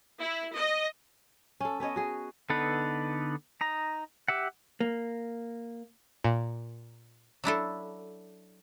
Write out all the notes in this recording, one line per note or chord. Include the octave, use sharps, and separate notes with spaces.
E4
D#5
C#4 A4
B3 C#4 C#5 D#5
F#4 G#4
D3 B3 D#4 A4 B4
D#4 A#5
G4 E5 F#5
A#3
A#2
F#3 D4 E4 A4